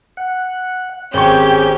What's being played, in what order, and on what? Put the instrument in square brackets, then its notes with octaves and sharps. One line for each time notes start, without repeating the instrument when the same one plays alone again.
[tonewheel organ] F#5
[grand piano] G#1 C#6 [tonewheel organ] C4 C#4 G#4 [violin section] G4 G6 G#6